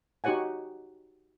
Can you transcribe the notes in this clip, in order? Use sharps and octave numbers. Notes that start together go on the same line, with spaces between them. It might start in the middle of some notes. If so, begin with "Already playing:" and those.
D#4 F#4 G4 C#5 F#5 G#5